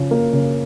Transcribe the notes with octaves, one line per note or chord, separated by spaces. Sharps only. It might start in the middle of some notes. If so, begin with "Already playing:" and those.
Already playing: C#3 F3
A#3
C#3